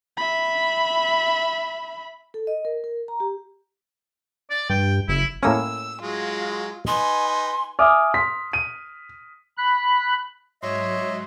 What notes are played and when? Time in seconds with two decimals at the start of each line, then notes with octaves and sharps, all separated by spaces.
0.17 E5 B5
2.34 A4
2.47 D#5
2.65 A#4
2.84 A#4
3.08 A#5
3.20 G4
4.50 D5
4.70 G2 G5
5.08 F#1 E4
5.43 A2 A#3 C#4 E6
6.02 F#3 G#3 F4
6.87 D#4 B4 G#5 C6
7.79 E5 G#5 D6 D#6 F6
8.14 C6 B6
8.53 D#7
9.58 B5 F#6
10.63 G#2 F#3 C#5 D#5 E5 C6